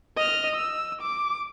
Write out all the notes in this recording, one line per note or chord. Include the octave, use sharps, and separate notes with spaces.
D#5 F6
E6
D6